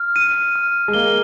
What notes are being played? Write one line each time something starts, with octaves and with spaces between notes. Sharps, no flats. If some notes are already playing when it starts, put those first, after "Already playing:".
Already playing: F6
D#7
F6
G#3
A#3 G7